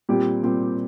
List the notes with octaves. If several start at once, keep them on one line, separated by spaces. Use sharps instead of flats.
A#2 G3 C4 G4
A#2 G3 C4 G4